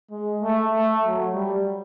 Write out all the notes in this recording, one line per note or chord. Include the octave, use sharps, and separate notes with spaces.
G#3
A3
A3
F#3
G3